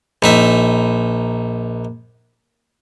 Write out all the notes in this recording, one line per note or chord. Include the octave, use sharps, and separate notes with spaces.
A#1 D#4 E5